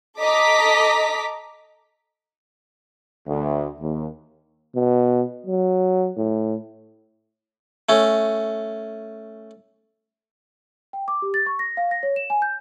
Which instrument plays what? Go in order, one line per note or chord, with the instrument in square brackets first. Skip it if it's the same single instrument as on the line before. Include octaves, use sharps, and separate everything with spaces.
[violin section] A4 D#5 A#5 D6 B6
[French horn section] D2
D#2
[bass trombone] B2
F#3
A2
[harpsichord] A3 C#4
[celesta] G5
D6
G4
A6
C#6
A#6
F5
A#6
C#5
E7
G#5
G6